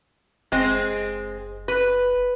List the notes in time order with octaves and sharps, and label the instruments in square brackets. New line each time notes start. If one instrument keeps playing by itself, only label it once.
[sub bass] F#1 [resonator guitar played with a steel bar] G#3 C4
[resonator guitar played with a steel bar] B4